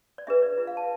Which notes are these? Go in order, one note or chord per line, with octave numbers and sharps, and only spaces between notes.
D5
D4 G#4 B4 E5
D5
F4 B4 E5
F5
A5